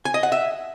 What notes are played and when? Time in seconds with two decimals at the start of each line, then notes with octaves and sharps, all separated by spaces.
0.05 G#5
0.14 D#5
0.23 F#5
0.32 E5